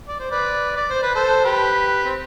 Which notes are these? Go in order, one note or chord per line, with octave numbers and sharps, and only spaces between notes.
D5
C5
B4 D5
D5
C5
B4
A4 C5
G4 B4
C4